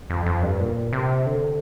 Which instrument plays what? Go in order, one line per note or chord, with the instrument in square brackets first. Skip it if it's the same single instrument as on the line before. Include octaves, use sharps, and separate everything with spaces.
[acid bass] F2
F2
G2
A#2
C3
D3